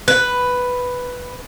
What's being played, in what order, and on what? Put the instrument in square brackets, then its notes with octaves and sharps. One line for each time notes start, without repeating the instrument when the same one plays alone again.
[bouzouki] B4